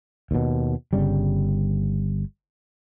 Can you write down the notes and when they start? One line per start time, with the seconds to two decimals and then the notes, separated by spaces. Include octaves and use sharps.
0.31 D#2 B2
0.93 G1 C#3 G3